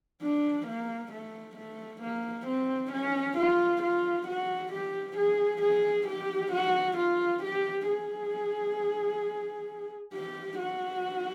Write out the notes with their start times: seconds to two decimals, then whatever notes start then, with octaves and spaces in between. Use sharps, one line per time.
0.22 D4
0.67 A#3
1.12 A3
1.56 A3
2.02 A#3
2.46 C4
2.92 C#4
3.38 F4
3.82 F4
4.27 F#4
4.72 G4
5.18 G#4
5.62 G#4
6.07 G4
6.52 F#4
6.97 F4
7.43 G4
7.88 G#4
10.13 G4
10.58 F#4